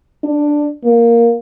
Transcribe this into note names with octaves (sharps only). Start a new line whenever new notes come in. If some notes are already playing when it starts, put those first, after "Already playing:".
D4
A#3